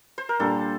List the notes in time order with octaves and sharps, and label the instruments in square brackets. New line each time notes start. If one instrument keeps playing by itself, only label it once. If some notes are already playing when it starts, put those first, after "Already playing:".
[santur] C5
A#4
[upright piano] A#2 G3 D4 [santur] A4